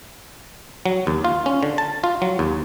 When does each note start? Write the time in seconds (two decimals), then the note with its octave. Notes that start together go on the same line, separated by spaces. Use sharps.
0.86 F#3
1.07 D#2
1.24 F4
1.46 C#4
1.63 D3
1.78 A5
2.04 F4
2.22 F#3
2.39 D#2